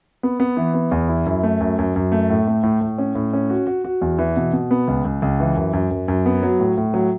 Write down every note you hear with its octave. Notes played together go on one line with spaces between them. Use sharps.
B3
B3
E3
B3
E2
E4
F#2
A3
F#2
F#2
F#2
A3
A2
A3
A2
A2
C#4
A2
C#4
F#4
F#4
F#4
E2
E3
B2
B2
B3
C#2
C#2
C#2
E3
F#2
F#2
F#2
F#2
B3
F#3
A2
A2
F#3